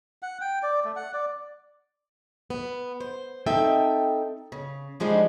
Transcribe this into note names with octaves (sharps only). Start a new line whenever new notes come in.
F#5
G5
D5
A3
F#5
D5
B3
C5
C4 D#4 A4 E5 G5 A5
C#3
D3 F3 G3 G#3 D4 D#4